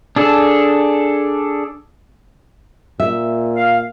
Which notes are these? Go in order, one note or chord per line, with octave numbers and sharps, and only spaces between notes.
D4 G#4 A4
A#2 E5
F5